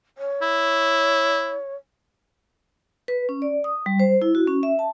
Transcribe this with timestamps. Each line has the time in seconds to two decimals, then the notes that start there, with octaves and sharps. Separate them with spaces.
0.18 C#5
0.42 E4
3.08 B4
3.29 C#4
3.42 D5
3.64 D#6
3.86 G3
4.00 C5
4.22 E4
4.35 F#4
4.47 C#4
4.63 E5
4.79 A5